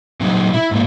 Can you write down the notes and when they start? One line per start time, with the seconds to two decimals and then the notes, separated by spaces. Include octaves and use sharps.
0.21 A#2 F#3 C4 D#4
0.53 E4
0.71 G#2 A3 A#3